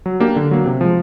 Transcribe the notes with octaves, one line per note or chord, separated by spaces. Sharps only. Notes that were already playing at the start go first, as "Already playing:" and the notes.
F#3
A#3 D4 G4
D3
F#3 A#3
C3
F3 G#3